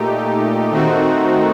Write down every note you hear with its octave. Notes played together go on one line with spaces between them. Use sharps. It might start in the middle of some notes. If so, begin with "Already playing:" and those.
Already playing: A#2 A3 D#4 G4
D#3 A3 C4 D#4 F#4